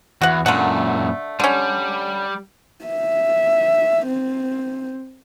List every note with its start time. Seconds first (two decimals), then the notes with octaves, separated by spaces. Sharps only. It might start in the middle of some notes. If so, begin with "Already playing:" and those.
0.21 E2 F#4 F#5
0.46 F#2 A#2 D3 A3 F#5
1.40 D3 G3 C#4
2.86 E5
4.07 C4